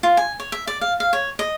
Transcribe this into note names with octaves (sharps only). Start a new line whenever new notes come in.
F4
G#5
C#5
E5
D5
F5
F5
C#5
D#5